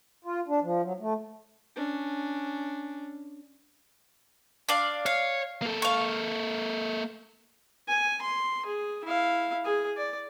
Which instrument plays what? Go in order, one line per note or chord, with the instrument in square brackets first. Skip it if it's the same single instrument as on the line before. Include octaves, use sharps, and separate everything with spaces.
[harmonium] F4
D4
F3
F#3
A3
[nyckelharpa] C#4 D4
[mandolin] D4 D5 F5
[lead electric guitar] C#5 [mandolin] F5
[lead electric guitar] A#3 A4
[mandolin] F5 C#6
[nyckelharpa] G#5
C6
G#4
E4 F5
G#4
D5